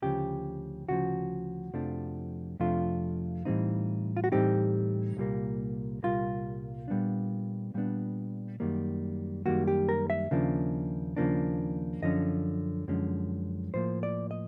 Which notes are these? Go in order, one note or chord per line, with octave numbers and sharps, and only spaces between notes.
D2 C#3 F3 G4
D2 C#3 F3 F#4
F2 C3 F3 A3 D4
F2 C3 F3 A3 D4 F4
A2 E3 G3 C4 D#4
F4
F#4
A2 E3 G3 C4 D#4 G4
C2 A#2 G3 A#3
C2 A#2 G3 A#3 F4
A#2 G3 B3 D4
A#2 G3 B3 D4
F#2 D#3 G3 A#3
F#2 D#3 G3 A#3 F#4
G4
A#4
E5
D#2 C#3 F3 A#3 D4
D#2 C#3 F3 A#3 D4
F#2 D3 F3 C#4 D#5
F#2 D3 F3 G#3 C#4
A2 F3 A#3 C5
D5
D#5